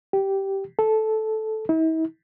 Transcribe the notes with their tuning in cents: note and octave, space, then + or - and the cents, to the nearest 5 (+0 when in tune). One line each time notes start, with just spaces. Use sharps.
G4 -10
A4 -10
E4 -45